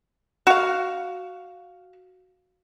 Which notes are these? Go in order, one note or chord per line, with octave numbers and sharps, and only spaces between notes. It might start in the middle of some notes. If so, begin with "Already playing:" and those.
F#4 F5